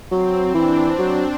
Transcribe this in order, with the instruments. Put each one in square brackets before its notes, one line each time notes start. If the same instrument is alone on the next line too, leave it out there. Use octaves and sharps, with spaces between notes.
[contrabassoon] F#3 [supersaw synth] C4
[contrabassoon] E3 [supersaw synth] D4
[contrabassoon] F#3 [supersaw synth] C4